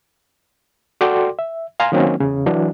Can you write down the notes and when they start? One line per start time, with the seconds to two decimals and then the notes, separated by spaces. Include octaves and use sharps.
1.01 F#4 A4 D5 G5 C6 D6
1.39 E5
1.80 F5 G#5 A#5 C6
1.92 D#3 F#3 A#3 C4 C#4
2.20 E2 C#3
2.46 E3 F#3 D4